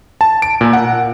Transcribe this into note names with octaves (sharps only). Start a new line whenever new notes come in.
A5
D7
A#2
F#5